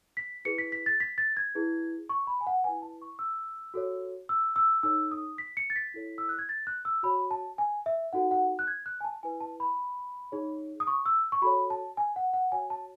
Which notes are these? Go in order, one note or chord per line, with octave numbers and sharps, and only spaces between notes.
B6
E4 G#4 B4 C#7
B6
B6
A6
B6
A6
G#6
E4 G#4 B4
C#6
B5
G#5
F#5
E4 B4 G#5
A5
C#6
E6
F#4 A4 C#5
E6
E6
D#4 A4 C#5 E6
D#6
B6
C#7
A6
B6
E4 A4 C#5
E6
F#6
G#6
A6
F#6
E6
F#4 C#5 B5
A5
G#5
E5
D#4 F#4 A4 F#5
F#5
F#6
G#6
F#6
G#5
A5
E4 B4 G#5
A5
B5
D#4 G#4 C#5
D#6
C#6
E6
C#6
F#4 A4 C#5 B5
A5
G#5
F#5
F#5
F#4 C#5 G#5
A5